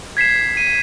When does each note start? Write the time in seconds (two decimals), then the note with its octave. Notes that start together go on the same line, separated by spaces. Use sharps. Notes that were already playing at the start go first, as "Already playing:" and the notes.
0.17 G#6 B6 C7 E7
0.57 D#7